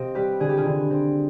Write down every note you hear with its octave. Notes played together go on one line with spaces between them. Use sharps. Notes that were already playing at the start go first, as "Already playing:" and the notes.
Already playing: C3 C4 D#5 F5
G3 G4 B4
D3 G#4
G4
F4 G#4
D3
C4